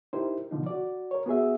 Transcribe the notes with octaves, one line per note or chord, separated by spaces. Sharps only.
D#4 E4 G4 A#4 C5
B2 D3 F3 D#4
F#4 D5
A#4 C#5
B3 F#4 G#4 E5